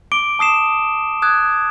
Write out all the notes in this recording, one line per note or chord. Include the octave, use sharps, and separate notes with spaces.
D6 D7 G7
A5 D#6 C7 E7
D#6 F#6 G#6